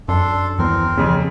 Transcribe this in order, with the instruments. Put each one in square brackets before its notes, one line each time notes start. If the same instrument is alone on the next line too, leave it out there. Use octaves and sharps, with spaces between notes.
[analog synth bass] F#2 [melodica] D4 A4 C6
[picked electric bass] D#2 E3 B3 [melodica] C4 A#4
[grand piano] F2 C#3